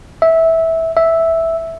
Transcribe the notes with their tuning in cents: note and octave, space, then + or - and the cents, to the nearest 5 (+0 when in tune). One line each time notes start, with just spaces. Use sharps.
E5 -15
E5 -5